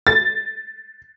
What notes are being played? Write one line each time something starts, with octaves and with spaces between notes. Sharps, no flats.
A6